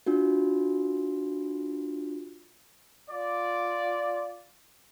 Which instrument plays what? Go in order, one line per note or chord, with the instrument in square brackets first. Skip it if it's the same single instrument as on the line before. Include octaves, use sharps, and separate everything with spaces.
[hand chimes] D4 F4 F#4
[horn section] F4 D5